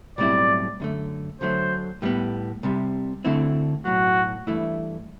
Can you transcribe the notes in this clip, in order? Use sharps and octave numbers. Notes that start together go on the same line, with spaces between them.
B1 A2 G3 C4 E4 D5
F#2 D3 A3
D2 D3 F#3 A3 C5
A2 G3 B3
C2 C3 G3
D2 D3 A3 C4 E4
B1 A2 F#3 F#4
G2 E3 A3 E4